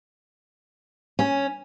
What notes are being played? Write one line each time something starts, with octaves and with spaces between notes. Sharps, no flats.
C#4